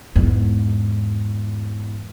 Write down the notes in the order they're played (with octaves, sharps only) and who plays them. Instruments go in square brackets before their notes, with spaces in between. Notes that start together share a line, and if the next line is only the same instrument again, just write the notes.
[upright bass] E2 G#2